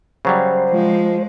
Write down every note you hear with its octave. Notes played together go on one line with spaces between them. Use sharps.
C#3 F#3 G3 C5
F3 G#3